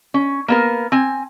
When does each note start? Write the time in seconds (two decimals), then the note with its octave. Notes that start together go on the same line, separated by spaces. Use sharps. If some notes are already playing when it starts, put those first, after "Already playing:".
0.14 C#4
0.48 A#3 B3 A#4
0.92 C4 G#5